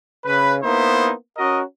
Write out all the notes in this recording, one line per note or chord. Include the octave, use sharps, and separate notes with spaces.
C#3 B4
A#3 B3 D#4 E4 C5
C#4 F#4 A#4 D#5